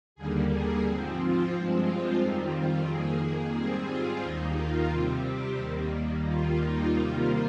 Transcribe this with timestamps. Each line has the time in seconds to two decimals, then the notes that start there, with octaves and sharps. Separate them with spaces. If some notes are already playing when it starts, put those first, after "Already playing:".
0.15 D#2 D3 G3 A#3 G#4
0.49 G#4
0.84 G#2 F3 C4
1.18 F4
1.51 G2 F3 G#3 C4
1.85 F4
2.19 F2 D#3 G3 C4 D#4
2.53 F4
2.86 F2 D#3 A#3 G#4
3.54 G#2 G3 C4 G#4
3.87 F4
4.21 D#2 D#3 A#3 D#4
4.55 F4
4.89 C3 G3 C4 F4
5.23 G4
5.57 D#2 D#3 G3 A#3
6.24 D#2 D#3 G3 A#3 F4
6.58 D#4
6.92 C3 D#3 G3 A#3 F4